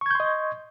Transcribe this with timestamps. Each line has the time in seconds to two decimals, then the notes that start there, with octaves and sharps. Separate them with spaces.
0.01 C#6
0.06 G#6
0.11 G6
0.15 C6
0.20 D#5